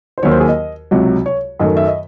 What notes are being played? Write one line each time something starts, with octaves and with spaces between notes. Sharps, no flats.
C5
D#2 D#3 F#3 C#5
C5
G#4
D#5
C#2 C3 F#3
C#5
F#2 D#3 F#3 A3 D#5
E5
D#5